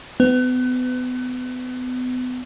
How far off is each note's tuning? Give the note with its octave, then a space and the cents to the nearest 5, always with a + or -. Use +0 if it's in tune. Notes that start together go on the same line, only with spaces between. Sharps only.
B3 +35